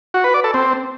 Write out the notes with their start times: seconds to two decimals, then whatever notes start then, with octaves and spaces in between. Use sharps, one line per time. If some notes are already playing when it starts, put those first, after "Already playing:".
0.14 F#4
0.24 B4
0.34 D5
0.44 A4
0.54 C4